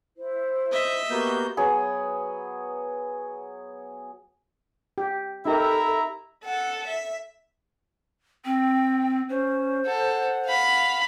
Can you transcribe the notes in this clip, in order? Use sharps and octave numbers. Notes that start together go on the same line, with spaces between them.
E4 C5
D#5 E5
A#3 B3 F#4 G4 G6
F#3 B3 G#4 B5
G4
D#4 E4 G4 A4 A#4 E5 A#5
A4 F#5
E5
C4 G5
C#4 C5
A4 F#5
F5 B5